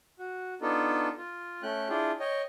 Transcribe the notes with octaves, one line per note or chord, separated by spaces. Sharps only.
F#4
B3 D4 D#4 F4 A4
F4
A3 C#4 G5 F#6
D4 E4 F4 G#4 G5
C#5 D#5 G5